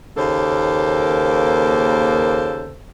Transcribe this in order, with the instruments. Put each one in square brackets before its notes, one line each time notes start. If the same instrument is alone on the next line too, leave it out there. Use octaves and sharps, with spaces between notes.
[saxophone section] D#2 C#3 A#3 A4 C5